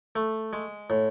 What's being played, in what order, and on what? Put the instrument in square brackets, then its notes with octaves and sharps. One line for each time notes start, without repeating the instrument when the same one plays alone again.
[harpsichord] A3
G#3
A2